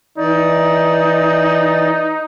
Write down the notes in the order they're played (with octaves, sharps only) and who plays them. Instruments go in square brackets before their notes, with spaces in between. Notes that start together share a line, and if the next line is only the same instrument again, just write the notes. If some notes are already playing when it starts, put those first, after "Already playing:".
[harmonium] E3 D5 [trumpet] D#4